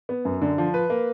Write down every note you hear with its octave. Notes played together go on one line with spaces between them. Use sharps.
B3
F#2
D3
F3
B4
A#3